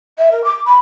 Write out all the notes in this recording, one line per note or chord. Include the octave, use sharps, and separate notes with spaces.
E5
A#4
D6
B5